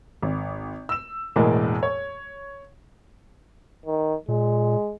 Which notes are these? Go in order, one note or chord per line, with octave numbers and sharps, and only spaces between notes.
G#1
E6 E7
E1 E2 A2 G#3 A#3
C#5
D#3
A#2 G#3